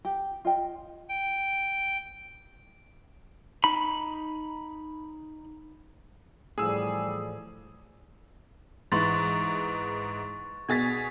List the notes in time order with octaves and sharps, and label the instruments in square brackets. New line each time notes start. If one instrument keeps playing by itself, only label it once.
[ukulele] G4
F4 D#5 G5
[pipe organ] G5
[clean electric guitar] D#4 B5
[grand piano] A2 E3 F3 [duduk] G3 [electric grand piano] G#4 E6
[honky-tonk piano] G#2 E3 [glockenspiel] C6 C#6 A6
[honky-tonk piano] B2 G#4 A6 [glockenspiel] G#6 B6